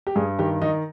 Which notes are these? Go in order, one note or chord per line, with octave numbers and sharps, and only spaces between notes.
G4
G2 G#4
D#3 G4
D#3 D#4